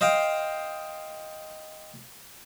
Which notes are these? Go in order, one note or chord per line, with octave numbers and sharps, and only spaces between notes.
C5 D#5 F5 G5